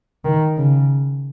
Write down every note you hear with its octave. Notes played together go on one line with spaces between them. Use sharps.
D#3
C#3